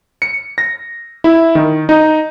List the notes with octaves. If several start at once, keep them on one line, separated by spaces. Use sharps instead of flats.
C#7
A#6
E4
D#3
D#4